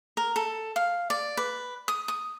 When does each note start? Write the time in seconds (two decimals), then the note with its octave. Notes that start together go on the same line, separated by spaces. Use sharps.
0.17 A#4
0.36 A4
0.76 F5
1.10 D5
1.37 B4
1.88 D#6
2.08 D#6